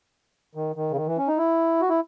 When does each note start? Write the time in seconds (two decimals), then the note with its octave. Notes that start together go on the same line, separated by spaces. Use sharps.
0.55 D#3
0.76 D#3
0.91 C#3
0.96 D#3
1.07 E3
1.18 C#4
1.28 D#4
1.38 E4
1.81 F#4
1.89 E4